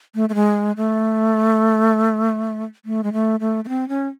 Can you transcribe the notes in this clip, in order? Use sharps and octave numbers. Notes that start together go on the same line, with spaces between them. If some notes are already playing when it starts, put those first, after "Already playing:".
A3
A3
G#3
A3
A3
G#3
A3
A3
A3
C4
C#4